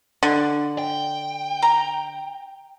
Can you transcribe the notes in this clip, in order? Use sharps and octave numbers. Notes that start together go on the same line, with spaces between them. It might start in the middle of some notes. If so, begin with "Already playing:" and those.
D3
G5
A#5